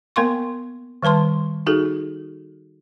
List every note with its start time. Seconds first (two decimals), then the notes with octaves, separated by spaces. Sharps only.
0.16 A#3 B3 A#4 F5 C6 C#6
1.02 D#3 G3 B4 A5 C6
1.66 D#4 F#4 G#4 A4